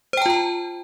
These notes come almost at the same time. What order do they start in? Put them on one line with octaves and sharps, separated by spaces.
C5 G5 A5 F4 A#5